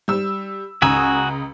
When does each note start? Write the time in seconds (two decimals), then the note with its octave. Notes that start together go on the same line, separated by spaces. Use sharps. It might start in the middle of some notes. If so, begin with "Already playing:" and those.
0.08 G3 E6
0.82 C#2 F#4 G#5 A#5 D#6 E6